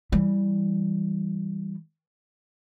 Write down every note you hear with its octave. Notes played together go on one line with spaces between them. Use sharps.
E3 G3